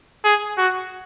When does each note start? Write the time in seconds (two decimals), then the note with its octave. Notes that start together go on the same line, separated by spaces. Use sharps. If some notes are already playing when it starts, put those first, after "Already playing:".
0.25 G#4
0.58 F#4